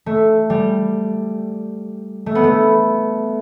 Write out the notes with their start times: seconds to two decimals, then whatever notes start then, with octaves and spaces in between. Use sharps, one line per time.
0.06 A3
0.50 G3
2.26 A3
2.35 B3
2.44 A3